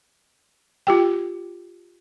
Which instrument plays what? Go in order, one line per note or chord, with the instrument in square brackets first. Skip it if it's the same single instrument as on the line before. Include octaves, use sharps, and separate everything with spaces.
[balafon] F4 G4 G5